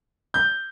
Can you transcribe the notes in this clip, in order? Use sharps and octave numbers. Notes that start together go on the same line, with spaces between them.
G6